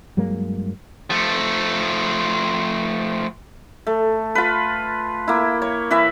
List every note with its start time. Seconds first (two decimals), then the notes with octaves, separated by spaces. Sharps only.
0.17 G2 F#3 G#3 A#3
1.10 F3 A3
3.87 A3
4.35 F4 B4
5.28 A#3 E4
5.62 C#5
5.90 E3 E4 B4 E5